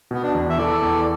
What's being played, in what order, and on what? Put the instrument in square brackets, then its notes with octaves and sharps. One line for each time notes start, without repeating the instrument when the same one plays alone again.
[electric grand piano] B2 [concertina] B3
[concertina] D4
[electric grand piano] E2
[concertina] E5
[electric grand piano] E3 [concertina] A4 D5
[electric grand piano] E2